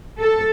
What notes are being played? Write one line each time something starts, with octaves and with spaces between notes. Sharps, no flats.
A4